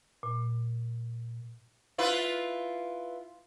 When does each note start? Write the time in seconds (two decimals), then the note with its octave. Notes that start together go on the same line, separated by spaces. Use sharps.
0.23 A#2
1.98 E4 F4 B4